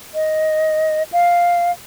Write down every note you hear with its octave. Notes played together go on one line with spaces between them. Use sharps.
D#5
F5